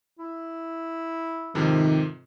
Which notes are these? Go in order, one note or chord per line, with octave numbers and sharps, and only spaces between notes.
E4
F2 G#2 C3 D#3